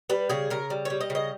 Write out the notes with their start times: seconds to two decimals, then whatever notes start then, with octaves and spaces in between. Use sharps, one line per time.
0.09 G3 B4
0.29 C#3 G#4
0.50 C#3 A#4
0.70 G3
0.85 G3 C#5
1.01 D#5
1.10 C#3
1.15 D#5